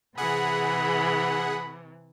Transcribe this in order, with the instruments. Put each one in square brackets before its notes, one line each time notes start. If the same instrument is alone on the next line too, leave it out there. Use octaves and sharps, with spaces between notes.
[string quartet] C3 E3 [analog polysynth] G#4 F#5 [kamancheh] B5